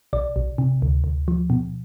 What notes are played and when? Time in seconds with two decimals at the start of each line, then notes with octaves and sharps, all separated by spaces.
0.13 B1 D5
0.36 B1
0.58 C3
0.82 D2
1.04 D2
1.28 F3
1.50 B2